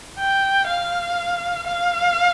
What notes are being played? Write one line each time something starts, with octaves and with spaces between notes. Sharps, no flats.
G5
F5
F5